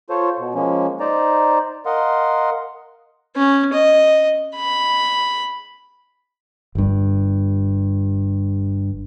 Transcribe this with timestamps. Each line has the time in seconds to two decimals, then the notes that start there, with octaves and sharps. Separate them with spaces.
0.10 F4 A4 C5 C#5
0.38 B2
0.55 F3 G#3 A#3 C#4
1.00 D#4 C5 D5 A#5
1.86 A#4 D#5 F5 F#5 C6
3.36 C#4
3.73 D#5
4.56 B5
6.75 G1 G2